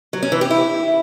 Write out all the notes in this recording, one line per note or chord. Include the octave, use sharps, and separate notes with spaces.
F#3
C#4
E3
G4
E4